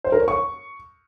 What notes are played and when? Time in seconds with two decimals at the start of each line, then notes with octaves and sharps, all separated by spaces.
0.04 C5
0.12 A#4
0.20 C#5
0.28 C#6